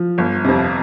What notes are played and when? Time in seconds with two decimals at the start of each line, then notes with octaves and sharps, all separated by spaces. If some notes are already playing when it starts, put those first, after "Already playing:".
Already playing: F3
0.18 G1
0.45 F2 C3